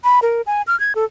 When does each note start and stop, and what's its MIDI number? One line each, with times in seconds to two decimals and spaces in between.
0.04 0.20 83
0.22 0.42 70
0.47 0.62 80
0.67 0.78 89
0.80 0.93 92
0.95 1.05 69